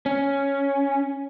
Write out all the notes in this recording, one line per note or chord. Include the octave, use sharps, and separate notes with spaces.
C#4